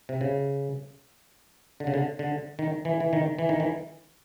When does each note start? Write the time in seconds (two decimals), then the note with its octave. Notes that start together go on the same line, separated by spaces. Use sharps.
0.09 C3
0.21 C#3
1.80 D3
1.87 C#3
1.94 D3
2.19 D3
2.59 D#3
2.85 E3
3.00 E3
3.13 D#3
3.39 E3
3.49 D#3
3.60 E3